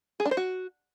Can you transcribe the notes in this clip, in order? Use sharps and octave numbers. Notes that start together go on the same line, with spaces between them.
G#4
D4
C5
F#4